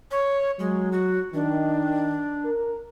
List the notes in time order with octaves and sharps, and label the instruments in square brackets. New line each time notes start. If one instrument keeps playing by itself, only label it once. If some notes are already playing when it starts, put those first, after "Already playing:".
[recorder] C#5
[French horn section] F#3 [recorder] G#3
[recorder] F#4
[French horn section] D#3 [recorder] D4
[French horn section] A#4